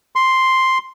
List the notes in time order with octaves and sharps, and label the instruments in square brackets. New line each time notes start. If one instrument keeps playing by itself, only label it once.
[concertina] C6